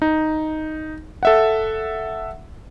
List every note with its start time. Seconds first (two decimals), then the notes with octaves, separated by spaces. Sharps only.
0.02 D#4
1.23 A4 E5 F#5